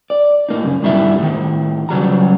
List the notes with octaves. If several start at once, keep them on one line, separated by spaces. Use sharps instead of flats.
D5
A2 A#3 D#4
F#2 C#3
G2 B2 D#3 G3 E4 E5
A2 D#3
C#3 F#3 G3 A#5